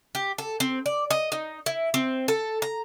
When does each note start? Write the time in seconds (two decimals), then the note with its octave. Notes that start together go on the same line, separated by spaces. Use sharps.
0.15 G4
0.38 A4
0.60 C4
0.86 D5
1.10 D#5
1.32 D#4
1.66 E4
1.94 C4
2.28 A4
2.62 A#5